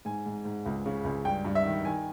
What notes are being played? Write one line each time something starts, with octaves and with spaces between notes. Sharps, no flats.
G#2 G#5
G#2
G#2
C#2
C#3
C#2
G2 G5
G2
E5
D#3
D#3 G#5